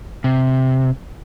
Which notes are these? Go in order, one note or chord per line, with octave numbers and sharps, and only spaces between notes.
C3